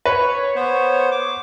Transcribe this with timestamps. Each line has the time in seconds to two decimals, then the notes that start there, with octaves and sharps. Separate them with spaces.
0.05 B4 C#5
0.56 B3 C5
1.11 D6